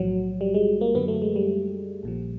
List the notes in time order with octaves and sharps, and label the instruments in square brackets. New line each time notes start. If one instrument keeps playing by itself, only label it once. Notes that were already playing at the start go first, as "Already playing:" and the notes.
Already playing: [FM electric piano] B1 A2 F3 F#3
G3
G#3
A#3
F#2 D3 F#3 B3
A3
G#3
G3
A#1 A#2 F3